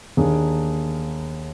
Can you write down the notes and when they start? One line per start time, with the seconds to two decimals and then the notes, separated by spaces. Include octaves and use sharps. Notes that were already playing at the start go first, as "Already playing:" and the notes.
0.17 D#2 D#3 A#3 D4 G#4